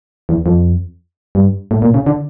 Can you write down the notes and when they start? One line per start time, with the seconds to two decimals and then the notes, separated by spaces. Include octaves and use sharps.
0.29 E2
0.46 F2
1.35 G2
1.71 A2
1.82 A#2
1.94 C#3
2.06 D3